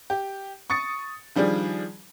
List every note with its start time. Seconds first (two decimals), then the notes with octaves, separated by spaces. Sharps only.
0.10 G4
0.70 C#6 D#6 A6 C#7
1.36 D#3 F3 G3 D4 G#4